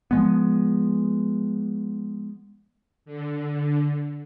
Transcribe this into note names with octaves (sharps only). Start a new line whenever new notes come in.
F3 G#3 B3
D3